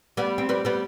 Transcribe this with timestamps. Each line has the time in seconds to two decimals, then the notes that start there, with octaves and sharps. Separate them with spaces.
0.17 G3 B3
0.38 C4
0.49 G3 B3
0.65 G3 B3